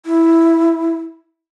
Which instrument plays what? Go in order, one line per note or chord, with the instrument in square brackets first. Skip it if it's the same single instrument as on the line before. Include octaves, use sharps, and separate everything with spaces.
[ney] E4